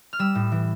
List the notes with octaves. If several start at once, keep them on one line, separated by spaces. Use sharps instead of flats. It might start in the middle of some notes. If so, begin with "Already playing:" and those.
F6
G3 E6
A2
E3